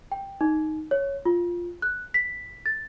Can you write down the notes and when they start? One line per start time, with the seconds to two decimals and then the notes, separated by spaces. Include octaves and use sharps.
0.12 G5
0.41 D#4
0.91 C#5
1.25 F4
1.82 F#6
2.14 B6
2.66 A6